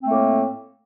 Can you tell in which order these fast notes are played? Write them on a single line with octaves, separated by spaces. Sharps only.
C4 A3 A#3 A2